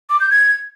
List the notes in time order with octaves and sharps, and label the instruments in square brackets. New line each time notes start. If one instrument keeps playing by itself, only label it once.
[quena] D6
G6
G#6